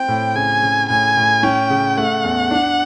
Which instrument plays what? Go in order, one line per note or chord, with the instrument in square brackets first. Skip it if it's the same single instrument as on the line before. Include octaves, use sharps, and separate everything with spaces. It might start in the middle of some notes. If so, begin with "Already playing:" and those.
Already playing: [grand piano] C4 [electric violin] G5
[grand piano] A2
[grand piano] C#3 [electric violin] G#5
[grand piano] C#3
[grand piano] A2 [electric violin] G#5
[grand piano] A2
[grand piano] C#4 [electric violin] G5
[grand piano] C#3
[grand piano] A3 [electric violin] F#5
[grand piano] E2
D4